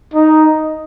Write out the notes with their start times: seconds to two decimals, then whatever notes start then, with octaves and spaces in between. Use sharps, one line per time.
0.14 D#4